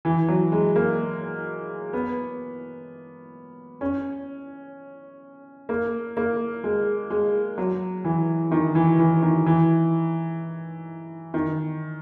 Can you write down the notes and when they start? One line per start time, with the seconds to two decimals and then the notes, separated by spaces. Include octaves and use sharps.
0.05 E3
0.28 F#3
0.52 G#3
0.76 A#3
1.93 B3
3.81 C#4
5.69 A#3
6.17 A#3
6.64 G#3
7.10 G#3
7.58 F#3
8.04 E3
8.51 D#3
8.75 E3
8.99 E3
9.22 D#3
9.46 E3
11.34 D#3